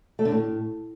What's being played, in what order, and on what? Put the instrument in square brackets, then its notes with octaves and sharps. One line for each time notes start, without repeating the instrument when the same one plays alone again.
[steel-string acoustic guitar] A3
D3
A2